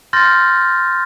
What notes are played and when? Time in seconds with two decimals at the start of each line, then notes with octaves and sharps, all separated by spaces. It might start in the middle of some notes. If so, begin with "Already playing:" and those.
0.13 C6 F6 G6 A6 A#6